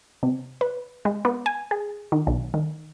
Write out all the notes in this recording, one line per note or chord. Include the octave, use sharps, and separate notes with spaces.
C3
B4
G#3
B3
G#5
G#4
D#3
B1
D#3